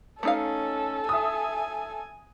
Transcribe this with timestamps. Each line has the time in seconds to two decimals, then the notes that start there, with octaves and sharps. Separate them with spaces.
0.23 A3 C#4 D#4 A4 F5
1.09 E5 G#5 D#6